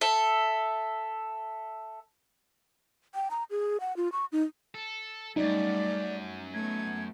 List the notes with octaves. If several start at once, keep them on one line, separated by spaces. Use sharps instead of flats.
A4 E5
G5
A#5
G#4
F#5
F4
C#6
D#4
A4
F#2 G3 A3 D#4 D5
A3 B3 G#6